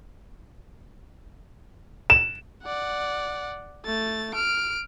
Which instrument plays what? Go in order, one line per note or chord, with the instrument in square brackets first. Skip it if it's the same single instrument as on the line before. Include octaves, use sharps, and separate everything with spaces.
[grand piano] E7
[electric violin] D5 F#5
A3 A6
F6 D7